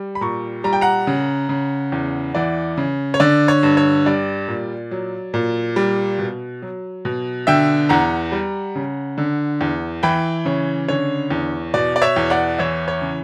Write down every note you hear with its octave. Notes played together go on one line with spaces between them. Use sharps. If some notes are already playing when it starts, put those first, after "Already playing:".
Already playing: G3
B5
A#2 A#5 C#6
G3 A#5
G5
F#5 A#5
C#3
C#3
E2
E3 D5 F#5
C#3
C#5
D3 D5
C#5
G2
C#5
G3 D5
A#2
F#3
A#2
G3
B2
F#3
B2
D3 E5 G5
E2 F#5 A#5
G3
C#3
D3
E2
E3 G5 B5
C#3 C#5
D3 C#5
E2
B2 D5
D5
C#5 E5
E2
D5 F#5
E3 C#5 E5
C#5
C#3